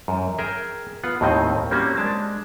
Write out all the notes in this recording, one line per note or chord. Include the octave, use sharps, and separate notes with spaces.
F#2
G#4 A#4 E5 G5
B3 F4 F#5
D#2 A2 D#3 C4 D#5
G3 A#3 C4 C#4 F#4
G#3 D4 A5